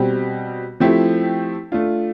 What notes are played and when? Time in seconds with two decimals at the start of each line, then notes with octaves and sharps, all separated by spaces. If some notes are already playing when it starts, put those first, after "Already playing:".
Already playing: B2 G3 C4
0.80 F3 A3 C4 E4 G4
1.72 A3 D4 F4